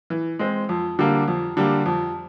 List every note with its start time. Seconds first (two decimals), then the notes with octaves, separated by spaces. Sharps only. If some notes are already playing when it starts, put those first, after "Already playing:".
0.10 E3
0.39 G#3 C4
0.69 F2
0.99 D3 G3 A#3
1.28 F2
1.57 D3 G3 A#3
1.86 F2